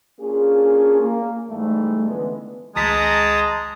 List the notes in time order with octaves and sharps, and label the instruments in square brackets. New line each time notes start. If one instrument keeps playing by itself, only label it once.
[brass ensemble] A#3 C#4 D4 F4 G#4
A#3
E2 G#2 G3 A3
C#2 D3 E3 G#3 B3
[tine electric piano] G#1 C#2 B6 [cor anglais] G#3 [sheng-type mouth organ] A5 A#5 D#6